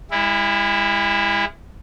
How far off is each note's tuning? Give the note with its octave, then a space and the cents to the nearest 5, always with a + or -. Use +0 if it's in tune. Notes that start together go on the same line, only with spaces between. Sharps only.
G#3 -40 E4 +0